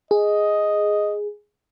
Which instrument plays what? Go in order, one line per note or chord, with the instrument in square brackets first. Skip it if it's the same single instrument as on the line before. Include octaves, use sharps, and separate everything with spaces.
[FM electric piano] G#4 [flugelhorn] D#5